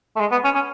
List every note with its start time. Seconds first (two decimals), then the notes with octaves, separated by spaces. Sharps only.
0.16 A3
0.20 G#3
0.32 B3
0.44 C#4
0.55 C#4